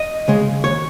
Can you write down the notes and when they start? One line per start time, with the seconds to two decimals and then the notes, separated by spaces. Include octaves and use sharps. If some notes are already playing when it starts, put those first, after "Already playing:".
Already playing: D#5
0.28 C#3 G#3
0.63 D#2 C#5